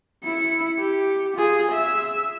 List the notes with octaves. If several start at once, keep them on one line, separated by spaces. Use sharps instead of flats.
E4 C#7
G4
F4 G#4
E5 E6